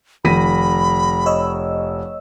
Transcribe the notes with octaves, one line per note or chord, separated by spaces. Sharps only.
F1 D#3 B5 A#6 B6 D#7
C#5 D#5 E6